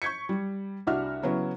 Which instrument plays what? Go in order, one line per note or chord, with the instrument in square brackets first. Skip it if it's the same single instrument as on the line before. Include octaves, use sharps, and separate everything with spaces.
[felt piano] C#6 G6 G#6 B6 C#7
G3
C2 D4 F#4 E5 F#5 F6
C#3 F#3 B3 E4